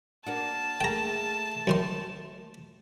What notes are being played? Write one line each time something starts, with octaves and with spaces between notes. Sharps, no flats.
A#3 D4 F#4 A5
A3 A#3 G#4 G5 A#5
F#2 D#3 C6